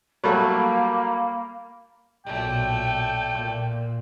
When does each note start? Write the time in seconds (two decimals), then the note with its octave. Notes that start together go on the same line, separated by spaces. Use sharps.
0.24 F#3 G3 A3 A#3 B5
2.26 B1 A#2 A3 D5 G5
3.33 A#2